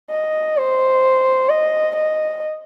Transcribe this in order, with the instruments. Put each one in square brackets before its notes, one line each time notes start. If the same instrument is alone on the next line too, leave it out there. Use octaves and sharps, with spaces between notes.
[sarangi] D#5
C5
D#5
D#5